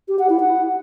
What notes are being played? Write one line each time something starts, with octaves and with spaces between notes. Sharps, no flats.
G4
F#5
E4
F#5